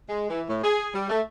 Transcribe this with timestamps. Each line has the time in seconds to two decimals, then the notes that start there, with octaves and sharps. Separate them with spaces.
0.09 G#3
0.30 E3
0.49 A2
0.64 G#4
0.94 G3
1.10 A3